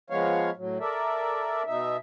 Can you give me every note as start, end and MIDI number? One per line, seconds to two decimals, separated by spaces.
0.10 0.50 53
0.10 0.50 56
0.10 0.50 59
0.10 0.50 73
0.10 0.50 77
0.57 0.78 45
0.57 0.78 54
0.80 1.63 69
0.80 1.63 70
0.80 1.63 74
0.80 1.63 76
1.67 1.97 47
1.67 1.97 63
1.67 1.97 76